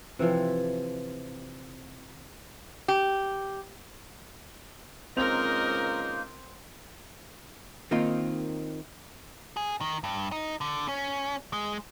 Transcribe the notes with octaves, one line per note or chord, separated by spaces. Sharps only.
C3 E3 F3
G4
C#2 A#3 C4 D#4 A#4 C5 D#5 F7
D#3 A#3 C4 D#4 F4
G#4
D#3
G2
D#4
D3
C#4
G#3